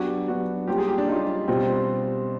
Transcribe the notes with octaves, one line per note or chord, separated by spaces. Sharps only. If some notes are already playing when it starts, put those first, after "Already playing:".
Already playing: F#3 B3 D4 F#4 G4
F#3 B3 D4 F#4 G4
G3 A#3 C#4 F4 G4
G#4
G4
D4
G3 A#3 C#4 D#4 F4
B2 G3 C4 F4